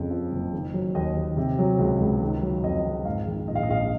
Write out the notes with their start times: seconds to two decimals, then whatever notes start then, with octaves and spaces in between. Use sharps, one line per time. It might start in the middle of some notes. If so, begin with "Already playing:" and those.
Already playing: F2 C#3
0.10 F3
0.32 F#1
0.53 D#3
0.74 F#3
0.95 D#2 D#5
1.16 D#2
1.37 C3
1.58 F#3
1.79 C#2
2.00 C#2
2.22 D#3
2.42 F#3
2.64 F2 D#5
2.85 F2
3.05 G#2 F5
3.27 D#3
3.48 A#1 D#5
3.55 F5
3.63 D#5
3.69 A#1 F5
3.79 D#5